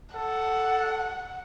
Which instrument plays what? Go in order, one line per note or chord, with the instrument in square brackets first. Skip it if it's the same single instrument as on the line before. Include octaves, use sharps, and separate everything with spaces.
[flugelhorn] A4 [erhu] F#5